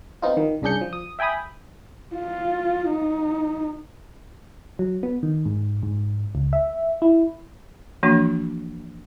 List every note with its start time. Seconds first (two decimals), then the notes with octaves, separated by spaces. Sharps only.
0.22 B3 C4 D#4 F4
0.37 D#3
0.62 C2 C#3 D4 G#4 G6 C#7
0.81 F3
0.93 D#6
1.19 E5 G5 G#5 B5 D#6
2.15 F4
2.89 D#4
4.79 F#3
5.03 B3
5.23 D#3
5.45 G#2
5.83 G#2
6.35 C#2
6.53 E5
7.02 E4
8.03 E3 F3 A#3 D4 F#4